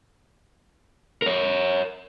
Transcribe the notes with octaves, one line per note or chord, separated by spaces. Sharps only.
A#4 C#5